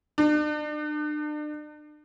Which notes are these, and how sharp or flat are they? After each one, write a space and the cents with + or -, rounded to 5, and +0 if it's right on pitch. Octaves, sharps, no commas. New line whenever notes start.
D4 +40